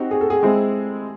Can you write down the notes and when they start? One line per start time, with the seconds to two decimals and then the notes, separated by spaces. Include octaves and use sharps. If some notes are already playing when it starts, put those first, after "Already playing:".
Already playing: C4 D#4 F#4 G4
0.11 G#4
0.21 A4
0.30 G#4
0.43 G#3 C4 E4